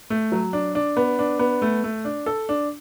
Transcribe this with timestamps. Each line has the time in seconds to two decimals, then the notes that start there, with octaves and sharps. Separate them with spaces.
0.10 A3
0.32 F#3
0.53 D4
0.75 D4
0.97 B3
1.19 D4
1.39 B3
1.62 A3
1.84 A3
2.05 D4
2.26 A4
2.49 D4